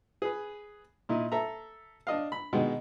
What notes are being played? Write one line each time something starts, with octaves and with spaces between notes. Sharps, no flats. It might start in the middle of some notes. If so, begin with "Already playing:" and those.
G#4 B4
A#2 D#4 E4
A4 E5 A#5
D4 D#5 F5
B5
B2 D#3 G#3